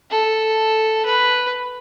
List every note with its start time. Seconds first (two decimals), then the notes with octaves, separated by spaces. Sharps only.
0.11 A4
1.06 B4